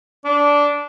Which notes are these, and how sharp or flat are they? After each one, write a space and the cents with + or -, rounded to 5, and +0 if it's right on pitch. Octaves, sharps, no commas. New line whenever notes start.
D4 -15